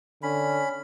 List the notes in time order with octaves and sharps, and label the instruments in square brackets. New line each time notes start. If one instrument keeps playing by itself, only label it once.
[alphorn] D3 [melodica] C#4 B5